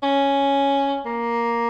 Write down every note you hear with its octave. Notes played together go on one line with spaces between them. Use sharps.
C#4
A#3